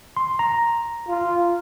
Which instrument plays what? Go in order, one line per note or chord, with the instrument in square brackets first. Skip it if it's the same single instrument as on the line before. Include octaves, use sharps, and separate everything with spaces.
[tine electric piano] C6
A#5
[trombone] F4